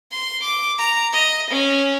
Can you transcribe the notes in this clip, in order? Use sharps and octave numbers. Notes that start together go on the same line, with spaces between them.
C6
D6
A#5
D#5
C#4